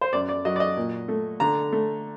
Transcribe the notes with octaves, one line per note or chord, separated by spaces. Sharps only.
C5
F#2 D5
D5
F#3 D#5
D5
D#5
A#2
A3
D3 A#5
A3